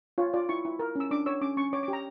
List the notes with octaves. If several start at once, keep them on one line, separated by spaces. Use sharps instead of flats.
F4 C#5
F4 D5
E4 C#6
E4
A#4
C#4 E6
D4 D6
C#5 E6
C#4 D6
C#4 C#6
C#5 D6
D6
G4
A#5